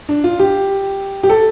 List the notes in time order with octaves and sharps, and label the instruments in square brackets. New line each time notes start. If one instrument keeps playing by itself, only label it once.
[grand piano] D4
F4
G4
G4
A4